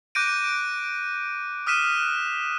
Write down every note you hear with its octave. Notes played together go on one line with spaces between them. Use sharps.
D6 F#6 G6 A#6 D7 D#7
D#6 F6 F#6 B6 D#7 E7